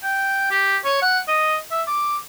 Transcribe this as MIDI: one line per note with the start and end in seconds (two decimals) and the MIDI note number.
0.03 0.49 79
0.51 0.76 67
0.85 1.02 73
1.02 1.19 78
1.28 1.56 75
1.71 1.82 76
1.87 2.17 86